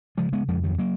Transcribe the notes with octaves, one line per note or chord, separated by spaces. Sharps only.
C#3 F3 G#3
G#3 B3
F2 F3 G#3
D#3 F#3
F#3 A#3